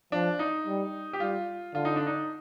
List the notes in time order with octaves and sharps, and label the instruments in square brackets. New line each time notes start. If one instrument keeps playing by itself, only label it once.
[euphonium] F3 [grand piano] D4
[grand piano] D#4
[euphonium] G3
[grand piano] G4
[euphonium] G3 [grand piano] F4
[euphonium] D3 [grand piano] F4
[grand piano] D#4
D4
D#4